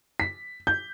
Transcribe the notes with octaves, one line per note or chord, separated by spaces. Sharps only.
B6
G6